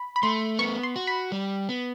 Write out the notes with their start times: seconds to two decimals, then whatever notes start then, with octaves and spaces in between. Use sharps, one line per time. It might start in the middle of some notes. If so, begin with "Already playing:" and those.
Already playing: B5
0.16 B5
0.23 A3 C6
0.59 B3 C#6
0.83 C6
0.96 F#4
1.07 B5
1.32 G3
1.69 B3